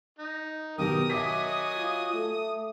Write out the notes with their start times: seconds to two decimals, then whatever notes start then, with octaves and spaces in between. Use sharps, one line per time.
0.19 D#4
0.78 B2 D#3 F#3 G4 A#4 D#6
1.10 F#3 D#5 E5 G#5 D6 B6
1.77 F4
2.14 A3